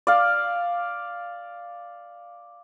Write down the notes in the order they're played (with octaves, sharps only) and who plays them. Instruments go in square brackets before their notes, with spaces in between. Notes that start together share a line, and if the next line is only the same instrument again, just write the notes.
[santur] D5 F5